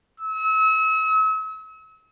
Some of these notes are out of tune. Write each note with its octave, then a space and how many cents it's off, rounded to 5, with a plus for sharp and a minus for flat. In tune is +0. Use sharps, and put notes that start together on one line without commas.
E6 -40